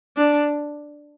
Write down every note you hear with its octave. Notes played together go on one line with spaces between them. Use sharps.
D4